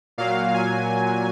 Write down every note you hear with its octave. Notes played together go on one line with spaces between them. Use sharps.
A#2 F#3 F5
G#5